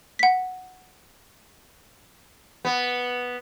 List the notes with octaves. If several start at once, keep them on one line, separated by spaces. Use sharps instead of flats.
F#5 B6
B3